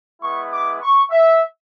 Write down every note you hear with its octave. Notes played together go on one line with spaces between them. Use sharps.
G#3 B3 E4 C#6
D6
C#6
E5